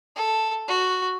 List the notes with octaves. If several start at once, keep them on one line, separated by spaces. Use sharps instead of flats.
A4
F#4